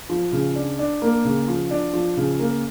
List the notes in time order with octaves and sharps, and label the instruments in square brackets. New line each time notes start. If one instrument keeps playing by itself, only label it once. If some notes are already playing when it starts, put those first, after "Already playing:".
[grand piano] F3
C#3
D4
D4
A#3
C#3
F3
D4
F3
C#3
A#3